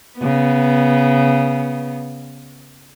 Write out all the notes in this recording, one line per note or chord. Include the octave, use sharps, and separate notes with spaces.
C#3 B3